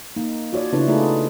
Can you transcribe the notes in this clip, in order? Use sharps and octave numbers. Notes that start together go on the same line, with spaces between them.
A#3 D#4
F4 F#4 C#5 D5
C#3 B3 D4 E4 F4 B4
A3 D#4 F4 G#4 D5